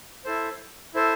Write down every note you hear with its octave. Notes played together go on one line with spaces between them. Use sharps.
E4 A4 C5
E4 A4 C5